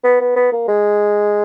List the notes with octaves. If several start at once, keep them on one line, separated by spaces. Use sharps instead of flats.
B3
B3
B3
A#3
G#3